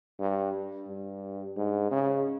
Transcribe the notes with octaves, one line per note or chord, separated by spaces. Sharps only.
G2
G2
G#2
C#3